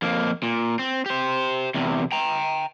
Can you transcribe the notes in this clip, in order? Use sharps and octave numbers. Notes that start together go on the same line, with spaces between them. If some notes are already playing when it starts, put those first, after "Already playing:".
F2 A#3
A#2
C4
G4 C5
E2 C3
G5 A#5